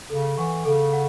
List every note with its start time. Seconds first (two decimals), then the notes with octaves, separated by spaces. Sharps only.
0.10 C#3 A4
0.37 E3 F#5 C#6
0.65 C#3 A4
0.93 F#5